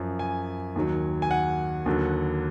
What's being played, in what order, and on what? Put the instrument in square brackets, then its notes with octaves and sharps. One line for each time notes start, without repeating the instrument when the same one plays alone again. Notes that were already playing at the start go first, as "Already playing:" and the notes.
Already playing: [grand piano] F#2 F3
G#5
D#2 D#3 F#3
G#5
F#5
D#2 D3 F#3